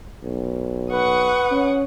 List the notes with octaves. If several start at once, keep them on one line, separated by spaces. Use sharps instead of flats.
B1
B4 F#5 C#6 D#6
C#4